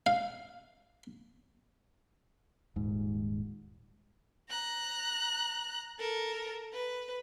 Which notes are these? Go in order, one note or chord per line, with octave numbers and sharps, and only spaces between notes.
F5
D#1 G#2
A#5 F#6
A4 A#4
B4